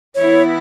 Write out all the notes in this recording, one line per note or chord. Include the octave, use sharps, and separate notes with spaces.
E3 B3 E4 C#5